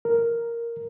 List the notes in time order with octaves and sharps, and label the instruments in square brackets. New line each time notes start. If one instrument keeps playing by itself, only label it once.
[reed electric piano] A#4